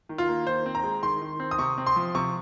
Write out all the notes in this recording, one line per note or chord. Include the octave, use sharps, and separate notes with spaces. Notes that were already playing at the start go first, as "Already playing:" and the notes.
D#3
F4
A#3
D#3 C5
C4
A#5
G#3
D#3 C6
D#3
C4
D#6
C3 C#6
C4
C6
F3
C3 C#6